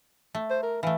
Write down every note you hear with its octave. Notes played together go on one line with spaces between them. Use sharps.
A3
C5
A#4
E3 A3 F5